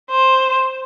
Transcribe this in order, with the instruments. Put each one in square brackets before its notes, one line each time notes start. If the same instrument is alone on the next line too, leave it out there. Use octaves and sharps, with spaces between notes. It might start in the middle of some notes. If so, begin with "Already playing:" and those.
[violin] C5